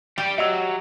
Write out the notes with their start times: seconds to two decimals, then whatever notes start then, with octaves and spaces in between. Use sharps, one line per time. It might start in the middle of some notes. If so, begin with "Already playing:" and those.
0.18 G3 G4 D5
0.38 F#3 D#5 E6